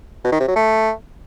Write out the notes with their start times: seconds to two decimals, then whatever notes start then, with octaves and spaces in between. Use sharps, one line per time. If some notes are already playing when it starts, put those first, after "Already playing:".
0.24 B2
0.32 D#3
0.40 C3
0.48 F#3
0.56 A3